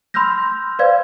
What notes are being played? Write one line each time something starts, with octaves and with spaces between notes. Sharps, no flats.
B5 C6 E6 F6 G6 A#6
B4 C5 D5 F5 G#6